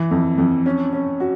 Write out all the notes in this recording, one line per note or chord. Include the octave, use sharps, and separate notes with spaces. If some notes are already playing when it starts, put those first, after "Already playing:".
Already playing: E3
F2
F2
C#4
C#4
F#4